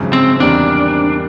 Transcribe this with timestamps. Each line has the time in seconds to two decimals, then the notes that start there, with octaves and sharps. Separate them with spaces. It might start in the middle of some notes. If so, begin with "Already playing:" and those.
Already playing: G#1 F#2 C#3 F3 G#3
0.13 C4
0.40 E2 C3 D#3 G3 A#3 D4